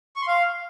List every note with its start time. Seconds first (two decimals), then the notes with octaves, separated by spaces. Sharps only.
0.16 C#6
0.22 C6
0.27 F5